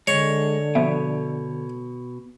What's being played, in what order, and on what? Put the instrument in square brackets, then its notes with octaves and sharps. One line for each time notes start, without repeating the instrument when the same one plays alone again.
[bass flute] D3 [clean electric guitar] G#3 [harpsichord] C#5
[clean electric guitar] B2 [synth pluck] F3 B3 E5